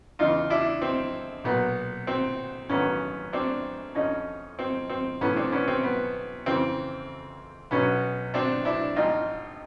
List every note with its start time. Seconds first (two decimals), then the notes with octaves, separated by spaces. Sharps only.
0.19 E2 C#3 E3 D#4 F4
0.50 D4 E4
0.82 C4
1.44 B1 A#2 F#3 B3
2.07 C4
2.69 A1 G2 D#3 F#3 B3 C#4
3.33 C4 D4
3.95 F2 D3 F3 C#4 D#4
4.59 C4
4.89 C4
5.21 B1 A2 E3 B3 C#4
5.36 C4 D4
5.52 B3 C#4
5.68 C4
5.83 B3
6.46 F2 C#3 E3 C4
7.71 B1 B2 F#3 B3 C#4
8.34 C4 D4
8.65 D4 E4
8.96 G#1 G#2 F3 D#4 F4